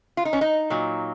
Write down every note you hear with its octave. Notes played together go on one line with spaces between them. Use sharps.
F4
D#4
C#4
D#4
A#2 F#3